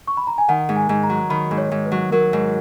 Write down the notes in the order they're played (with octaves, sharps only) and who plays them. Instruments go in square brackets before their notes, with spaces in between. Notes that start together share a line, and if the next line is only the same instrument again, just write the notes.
[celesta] C#6
B5
A#5
G#5
[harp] D#3 [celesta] F#5
[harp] G#2
[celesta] G#5
[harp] G#2
[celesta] A#5
[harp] F#3
[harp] D#3 [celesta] B5
[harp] G#2
[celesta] C#5
[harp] G#2
[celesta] B4
[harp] F#3
[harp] F#3 [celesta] A#4
[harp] G#2